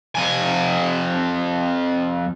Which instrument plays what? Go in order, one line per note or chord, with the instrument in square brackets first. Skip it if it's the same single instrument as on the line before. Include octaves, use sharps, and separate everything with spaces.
[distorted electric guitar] F2 G#5